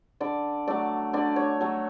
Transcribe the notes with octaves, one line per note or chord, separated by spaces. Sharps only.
D3 D5
F#3 A3 D5
D3 D5
C#5
F#3 A3